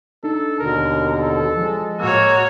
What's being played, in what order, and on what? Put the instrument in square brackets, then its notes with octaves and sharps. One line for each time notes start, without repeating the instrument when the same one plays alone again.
[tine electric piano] D4 D#4 [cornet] A4
[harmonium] D#2 B2 D3 [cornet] A#4
[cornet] A4
[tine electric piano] F3 [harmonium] G#3
[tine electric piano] A2 E6 [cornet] A#3 [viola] F#4 C#5